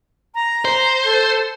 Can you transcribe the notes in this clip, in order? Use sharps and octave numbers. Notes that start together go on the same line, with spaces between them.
A#5
C5
A4